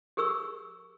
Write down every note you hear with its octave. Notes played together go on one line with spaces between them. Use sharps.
G4 G#4 A#4 C#6 E6